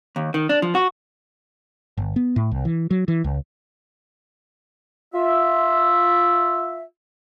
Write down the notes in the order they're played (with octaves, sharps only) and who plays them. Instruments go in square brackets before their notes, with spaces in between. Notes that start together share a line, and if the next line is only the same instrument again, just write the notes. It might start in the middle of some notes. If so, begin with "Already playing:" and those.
[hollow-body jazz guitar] D#2
D#3
D4
F3
F#4
[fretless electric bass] G1
B3
A2
C2
E3
F#3
E3
C#2
[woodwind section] F4 E5